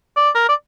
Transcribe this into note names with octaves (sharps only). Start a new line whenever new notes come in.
D5
A#4
D5